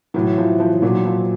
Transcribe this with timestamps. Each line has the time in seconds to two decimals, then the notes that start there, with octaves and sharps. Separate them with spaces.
0.14 A2 E3 F#3
0.38 F3
0.60 F3
0.82 A#2 F#3
1.05 F3